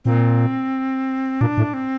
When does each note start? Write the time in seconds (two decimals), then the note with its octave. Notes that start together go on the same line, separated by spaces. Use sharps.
0.05 A#2 C4
1.41 A#2 D4
1.58 A2
1.74 C4